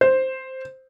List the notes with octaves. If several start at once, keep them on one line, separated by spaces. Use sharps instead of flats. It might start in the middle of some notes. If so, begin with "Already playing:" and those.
C5